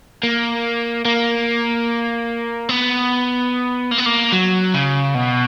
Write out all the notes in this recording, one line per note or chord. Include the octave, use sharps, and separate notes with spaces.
A#3
A#3
B3
A#3
B3
A#3
F#3
C#3
B2